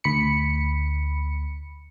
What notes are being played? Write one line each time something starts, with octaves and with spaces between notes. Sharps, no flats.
D2 B5 C#7